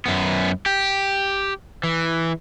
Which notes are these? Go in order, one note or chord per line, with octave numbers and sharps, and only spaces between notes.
F#2 B3
G4
E3